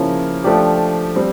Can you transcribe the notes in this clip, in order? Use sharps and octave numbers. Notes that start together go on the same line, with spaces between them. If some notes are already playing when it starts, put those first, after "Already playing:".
Already playing: C#3 F3 A#3 C#4 E4
F3 A3 D4 G4
G3 C4